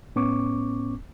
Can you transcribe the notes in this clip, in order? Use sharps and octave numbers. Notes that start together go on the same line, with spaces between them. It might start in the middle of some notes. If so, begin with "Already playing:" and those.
A2 B3 C#4 C#6 D6